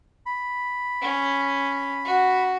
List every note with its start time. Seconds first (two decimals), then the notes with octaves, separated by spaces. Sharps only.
0.26 B5
1.02 C#4
2.05 F#4